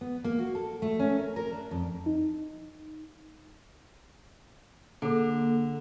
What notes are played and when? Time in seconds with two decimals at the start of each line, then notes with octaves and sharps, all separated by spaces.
0.01 B3
0.24 A#3
0.39 F#4
0.55 A4
0.82 A3
1.00 C#4
1.17 A#4
1.36 A#4
1.52 D4
1.71 F2
2.06 D#4
5.02 D3 A#3 G#4 A4